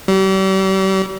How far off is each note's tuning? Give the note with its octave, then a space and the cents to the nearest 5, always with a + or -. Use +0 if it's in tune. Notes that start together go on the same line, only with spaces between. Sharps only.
G3 -40